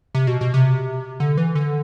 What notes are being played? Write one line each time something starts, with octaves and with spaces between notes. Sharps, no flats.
C3
B2
B2
C3
D3
E3
D3